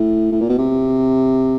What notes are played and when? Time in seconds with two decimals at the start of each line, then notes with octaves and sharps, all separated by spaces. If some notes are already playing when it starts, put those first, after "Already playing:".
Already playing: A2
0.32 A2
0.41 A#2
0.49 B2
0.58 C3